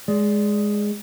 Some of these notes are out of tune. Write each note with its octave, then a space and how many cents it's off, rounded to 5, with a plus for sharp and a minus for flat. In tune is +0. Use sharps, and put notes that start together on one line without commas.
G#3 +0 D5 -15